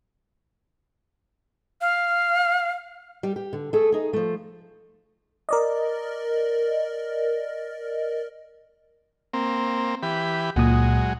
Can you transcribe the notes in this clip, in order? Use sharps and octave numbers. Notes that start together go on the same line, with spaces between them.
F5
G3 G4
G4
D3
A3 G#4 A4
D#4 G#4
F3 A3
A#4 D5 D#5
A#3 C4
E3 G4 B5
C#2 A#2 F#3 G#3 D#6